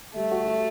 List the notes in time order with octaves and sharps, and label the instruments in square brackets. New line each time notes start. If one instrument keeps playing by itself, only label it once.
[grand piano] G3 [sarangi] A3
[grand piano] F#4
F#4